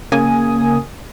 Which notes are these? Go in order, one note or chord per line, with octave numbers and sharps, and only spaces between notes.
C#3 A#3 G#5 D#6